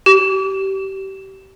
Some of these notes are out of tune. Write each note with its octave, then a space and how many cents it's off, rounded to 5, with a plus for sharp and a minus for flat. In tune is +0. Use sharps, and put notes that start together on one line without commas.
G4 -30